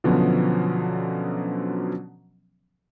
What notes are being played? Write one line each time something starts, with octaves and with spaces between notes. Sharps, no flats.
B2 D3 F3 F#3 B3 C#4